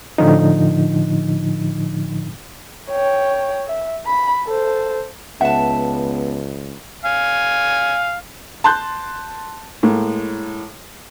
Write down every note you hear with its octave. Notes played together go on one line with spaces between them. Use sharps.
A2 D3 F3 D#4
C#5 G5
E5
B5
A4 C5
C#2 B3 E5 F#5 A5
F5 G#5
A5 C6 F#6 G6
A2 G#3 A#3